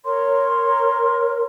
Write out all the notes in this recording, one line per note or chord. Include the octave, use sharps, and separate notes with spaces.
A#4 C#5 C6